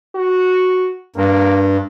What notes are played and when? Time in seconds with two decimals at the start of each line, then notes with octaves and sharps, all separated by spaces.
0.15 F#4
1.16 G2 A#3